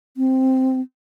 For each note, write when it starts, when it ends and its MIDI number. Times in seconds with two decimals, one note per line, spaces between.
0.17 0.80 60